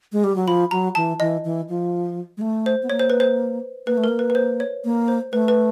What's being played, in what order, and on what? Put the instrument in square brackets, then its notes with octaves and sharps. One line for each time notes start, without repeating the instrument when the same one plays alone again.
[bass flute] G#3
G3
F#3
[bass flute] F3 [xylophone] B5
[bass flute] F#3 [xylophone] A#5
[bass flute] E3 [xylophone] A5
[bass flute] E3 [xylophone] D#5
[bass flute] E3
F3
G#3
A3
[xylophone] C5
[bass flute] B3
[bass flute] A#3 [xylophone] C#5
[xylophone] C5
B4
C5
[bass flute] A#3 [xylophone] B4
[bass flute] A3
[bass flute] A#3 [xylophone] A#4
[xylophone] B4
B4
C5
C#5
[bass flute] A#3
[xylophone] C5
[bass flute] A3 [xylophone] B4
[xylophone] B4